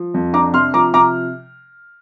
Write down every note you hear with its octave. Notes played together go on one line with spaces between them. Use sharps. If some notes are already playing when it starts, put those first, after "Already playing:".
Already playing: F3
F2
D4 A#5 D6
C3 C6 F6
F3 A#5 D6
C3 A#5 D6